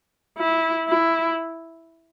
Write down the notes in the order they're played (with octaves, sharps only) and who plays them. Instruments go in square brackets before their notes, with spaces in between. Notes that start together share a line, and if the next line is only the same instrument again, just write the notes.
[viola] E4
E4